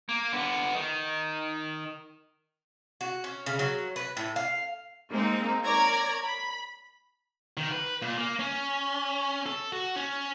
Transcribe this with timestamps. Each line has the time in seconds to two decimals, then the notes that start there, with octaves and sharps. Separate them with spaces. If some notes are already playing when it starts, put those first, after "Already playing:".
0.09 A#3
0.32 D3 B3
0.75 D#3
3.01 F#4
3.24 C#4
3.46 C#3
3.59 F#3
3.96 B4
4.17 A2
4.36 F5
5.10 G#3 A#3 C4 D#4
5.63 A#4 C#5 D5 A#5 G#6 A#6
6.22 B5
7.57 D#3
7.72 B4
8.02 A#2
8.18 A#3
8.39 C#4
9.46 A4
9.72 F#4
9.96 C#4